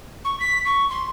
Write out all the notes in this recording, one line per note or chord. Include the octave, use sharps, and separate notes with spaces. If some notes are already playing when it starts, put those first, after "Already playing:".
C#6
B6
C#6
C6